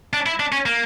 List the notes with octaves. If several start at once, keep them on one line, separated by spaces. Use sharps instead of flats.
D4
E4
D4
C#4
A#3